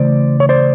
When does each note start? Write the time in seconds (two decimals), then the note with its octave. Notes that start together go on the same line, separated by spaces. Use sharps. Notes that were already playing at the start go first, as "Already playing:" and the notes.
Already playing: C#3 E3 A3 C5 D5
0.40 C#5
0.49 C5 D5